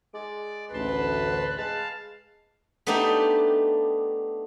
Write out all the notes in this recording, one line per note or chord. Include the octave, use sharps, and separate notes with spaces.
G#3 D5
A1 D2 B4 A5 C6
G#3 F5 A5
A3 B3 D4 D#4 G4